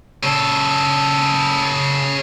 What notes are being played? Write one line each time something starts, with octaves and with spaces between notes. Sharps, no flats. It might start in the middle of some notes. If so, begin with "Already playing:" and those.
C#3 A4